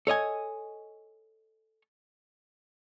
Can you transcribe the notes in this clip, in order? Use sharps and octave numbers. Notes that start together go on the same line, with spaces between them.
A4 C#5 D#5 G#5